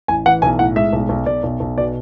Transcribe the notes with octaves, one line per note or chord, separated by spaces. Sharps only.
A1 G#5
E3 F#5
B1 G#5
A2 F#5
G#3 E5
B1
B1
B1 D5
B1
B1
B2 D5